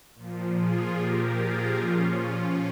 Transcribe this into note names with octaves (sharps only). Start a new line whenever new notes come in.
A#2 F3
F4 G#4
A#2 F3 G4 A#4
F4 G#4
A#2 F3 C#4 F4